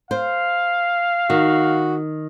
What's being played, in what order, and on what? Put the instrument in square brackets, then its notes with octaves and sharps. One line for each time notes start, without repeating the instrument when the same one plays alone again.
[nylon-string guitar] C5 [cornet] F5
[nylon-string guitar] D#3 [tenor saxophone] F#4